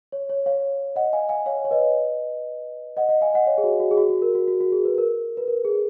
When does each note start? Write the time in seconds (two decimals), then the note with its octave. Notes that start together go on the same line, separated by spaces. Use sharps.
0.12 C#5
0.29 C#5
0.46 C#5 F5
0.96 D#5 F#5
1.13 F5 G#5
1.29 F5 G#5
1.46 C#5 F5
1.65 C#5
1.71 B4 D#5
2.97 D#5 F#5
3.09 D#5 F#5
3.21 F5 G#5
3.34 D#5 F#5
3.47 C#5 F5
3.58 G#4
3.64 F#4
3.80 F#4
3.91 G#4
3.97 F#4
4.09 F#4
4.22 A#4
4.35 F#4
4.48 F#4
4.61 F#4
4.72 G#4
4.85 B4
4.98 A#4
5.37 B4
5.48 A#4
5.64 G#4